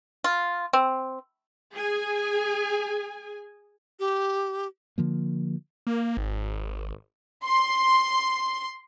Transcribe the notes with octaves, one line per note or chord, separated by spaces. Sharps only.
F4
C4
G#4 G#5
G4
D3 F3 A#3
A#3
G#1
C6